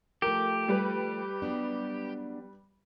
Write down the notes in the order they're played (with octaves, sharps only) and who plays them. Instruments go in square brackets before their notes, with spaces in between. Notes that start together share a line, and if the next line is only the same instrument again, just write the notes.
[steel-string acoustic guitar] F3 A3 [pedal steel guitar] G4 [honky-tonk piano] A#4
[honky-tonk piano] G3 B4
[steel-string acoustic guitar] F#3 B3 D4